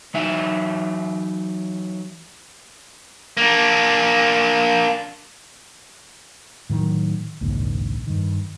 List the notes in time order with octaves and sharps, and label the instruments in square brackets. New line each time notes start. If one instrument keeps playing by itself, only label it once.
[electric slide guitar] E3 F#3 D#4 E5
[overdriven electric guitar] A#3 D4
[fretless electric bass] A2 D#3 E3 F#3
A#1 D#2 G#2 C#3
G2 D#3